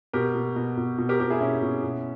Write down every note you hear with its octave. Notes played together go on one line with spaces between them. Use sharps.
B2 G4 A#4
B2
B2
B2
B2
G4 A#4
B2 G4 A#4
E4 G#4
B2 C#4 E4
B2
B2